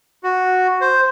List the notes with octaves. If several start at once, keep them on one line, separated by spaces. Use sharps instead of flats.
F#4
C5